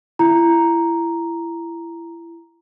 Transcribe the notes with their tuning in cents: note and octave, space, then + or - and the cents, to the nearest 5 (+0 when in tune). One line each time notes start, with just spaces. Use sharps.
E4 +25 A#5 +0